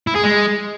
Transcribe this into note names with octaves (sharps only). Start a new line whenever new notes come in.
E4
G#4
G#3